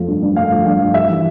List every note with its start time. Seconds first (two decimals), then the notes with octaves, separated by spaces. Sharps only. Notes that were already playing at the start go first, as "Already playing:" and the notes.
Already playing: F2 F3 A3
0.08 G2
0.22 G2
0.36 A3 F5
0.51 F3
0.66 G2 F5
0.81 G2
0.94 G3 E5
1.09 E3